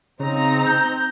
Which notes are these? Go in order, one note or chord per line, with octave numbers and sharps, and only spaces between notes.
C#3 C4 D#4 A#5
G6